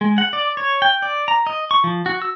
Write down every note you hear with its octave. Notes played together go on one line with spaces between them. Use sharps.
G#3
F#5
D5
C#5
G5
D5
A#5
D#5
C#6
F3
F#4
E6